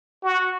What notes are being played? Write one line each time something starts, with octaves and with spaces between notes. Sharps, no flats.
F#4